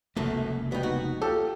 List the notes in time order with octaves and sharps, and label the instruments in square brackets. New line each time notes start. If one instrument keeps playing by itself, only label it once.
[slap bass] F1 C#2 A#3 [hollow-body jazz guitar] F#2 F#3 A3
[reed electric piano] G3 F#4 G5 [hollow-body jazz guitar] B3 D#4
[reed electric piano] B2 B3 D#4 [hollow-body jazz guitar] F#4
[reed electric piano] F4 G4 F5 [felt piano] A4